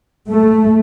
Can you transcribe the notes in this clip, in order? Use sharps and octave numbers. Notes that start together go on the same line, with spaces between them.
A3